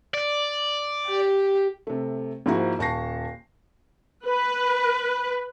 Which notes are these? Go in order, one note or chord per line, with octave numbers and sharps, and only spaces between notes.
D5
G4
C3 A3
G#2 F3 A#3 E4 F#4
D#1 A5 C#6 A#6 C7
B4